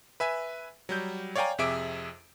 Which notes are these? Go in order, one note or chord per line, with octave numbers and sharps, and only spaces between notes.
B4 E5 G#5
F#3 G3 G6
C#5 D5 F5 G5 G#5 A#5
F2 C3 G#4 E5 D6 D7